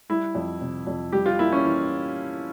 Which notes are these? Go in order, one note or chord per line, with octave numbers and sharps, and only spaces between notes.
G3 E4
F2
C3
F2
G3 G4
F4
A#3 E4
C#4
E3